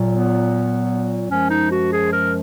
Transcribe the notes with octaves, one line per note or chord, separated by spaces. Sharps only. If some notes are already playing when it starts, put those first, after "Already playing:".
Already playing: A#2 F#3
B3
F#2 F3 G#3 C#4
D#4
F#4
G#4
A#4